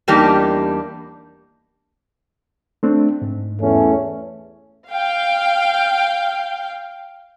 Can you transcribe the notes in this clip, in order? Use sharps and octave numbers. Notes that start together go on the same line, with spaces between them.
E2 G3 A#3 D4 D#4 G4
A3 C4 D4
G#2
E2 A3 C#4
F5 G5